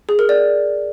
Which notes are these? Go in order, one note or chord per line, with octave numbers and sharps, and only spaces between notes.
G#4
A#4
D5